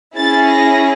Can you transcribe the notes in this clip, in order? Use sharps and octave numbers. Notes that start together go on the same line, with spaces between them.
C#4 E4 G#4 A6
A#6